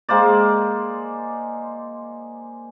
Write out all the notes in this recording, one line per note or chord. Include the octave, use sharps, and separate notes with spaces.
G#3 A#3 C5 D5